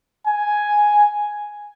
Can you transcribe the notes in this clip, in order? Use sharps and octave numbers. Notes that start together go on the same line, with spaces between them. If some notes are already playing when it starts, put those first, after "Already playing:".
G#5